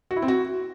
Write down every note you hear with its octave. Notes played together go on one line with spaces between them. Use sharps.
F#4
E4
C4
F#4